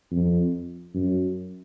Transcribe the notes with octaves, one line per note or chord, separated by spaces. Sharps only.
F2
F#2